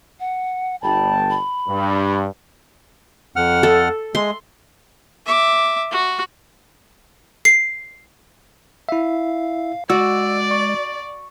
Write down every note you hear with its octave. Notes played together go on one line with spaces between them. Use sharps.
F#5
G1 G5 A5 B5
B5
G2
F2 F#5 F6
A4
G#3 C6
E5 D6
F#4
C7
E4 E5 F5
G#3 F#4 D5 E6
C#6